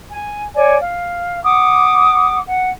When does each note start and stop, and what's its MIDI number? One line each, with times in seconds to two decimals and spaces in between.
0.10 0.43 80
0.55 0.76 73
0.55 0.76 74
0.55 0.76 80
0.78 1.41 77
1.43 2.39 78
1.43 2.39 86
1.43 2.39 87
2.47 2.68 78